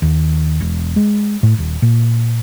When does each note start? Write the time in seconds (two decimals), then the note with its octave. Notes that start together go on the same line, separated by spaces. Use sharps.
0.02 D#2
0.61 E1
0.96 G#3
1.43 A2
1.58 D#1
1.82 A#2